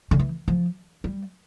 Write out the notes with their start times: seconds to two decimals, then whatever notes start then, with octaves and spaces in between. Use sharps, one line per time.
0.11 D3
0.19 E3
0.48 F3
1.04 G3